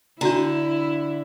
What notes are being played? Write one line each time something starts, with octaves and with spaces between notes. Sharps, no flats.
D3 D4 E4 F#4 A#5